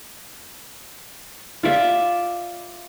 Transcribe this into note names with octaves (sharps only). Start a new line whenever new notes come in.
F4 D5 E5